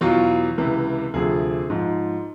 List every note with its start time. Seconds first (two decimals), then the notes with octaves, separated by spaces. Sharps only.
0.01 E2 B2 F#3 F4
0.58 C#2 C3 E3
1.14 D2 C3 F3 G#4
1.70 G#2 F3